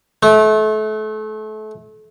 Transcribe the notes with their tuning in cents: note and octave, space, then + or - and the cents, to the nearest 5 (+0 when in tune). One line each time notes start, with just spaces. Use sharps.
A3 -30